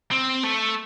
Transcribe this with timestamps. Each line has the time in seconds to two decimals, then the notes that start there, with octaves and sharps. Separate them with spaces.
0.11 C4
0.44 A3